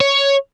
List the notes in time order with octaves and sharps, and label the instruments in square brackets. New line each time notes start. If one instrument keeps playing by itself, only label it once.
[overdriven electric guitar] C#5